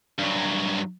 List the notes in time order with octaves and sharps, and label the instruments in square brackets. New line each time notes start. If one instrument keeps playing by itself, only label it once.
[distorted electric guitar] G2 F#3